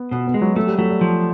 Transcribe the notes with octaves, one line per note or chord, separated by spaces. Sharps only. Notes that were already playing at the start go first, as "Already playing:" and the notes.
Already playing: B3
B2 B3
B3
G#3
F#3
F#3 A3
G3
F#3 A3
G3
F3